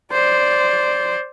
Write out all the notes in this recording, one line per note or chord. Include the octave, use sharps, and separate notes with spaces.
C5 D5